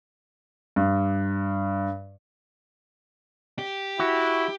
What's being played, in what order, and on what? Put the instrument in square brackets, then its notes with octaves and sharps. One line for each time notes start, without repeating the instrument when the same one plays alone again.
[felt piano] G2
[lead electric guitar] G4
[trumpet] E4 [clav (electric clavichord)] F#4